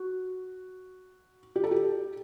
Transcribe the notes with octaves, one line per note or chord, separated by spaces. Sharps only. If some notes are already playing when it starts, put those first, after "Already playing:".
Already playing: F#4
G4
A4
G4